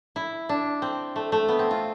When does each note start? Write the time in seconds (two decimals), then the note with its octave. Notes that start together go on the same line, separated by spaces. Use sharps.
0.16 E4
0.49 D4
0.82 C4
1.16 A3
1.32 A3
1.48 B3
1.59 C4
1.71 F4